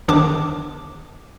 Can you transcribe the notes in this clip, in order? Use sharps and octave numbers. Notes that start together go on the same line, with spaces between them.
G1 E2 D#3 D4 D6